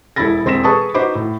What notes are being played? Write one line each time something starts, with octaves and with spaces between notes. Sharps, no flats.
E1 E4 A4 B5 A6 A#6
E1 C4 C6 A#6 B6 E7
G#4 A4 B4 A5 C#6 D#6
D#4 F#4 B4 C5 B5 D6
A2